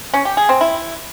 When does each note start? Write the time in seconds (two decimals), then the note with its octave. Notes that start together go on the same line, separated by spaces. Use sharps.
0.14 C#4
0.25 G4
0.37 G#4
0.49 C4
0.61 E4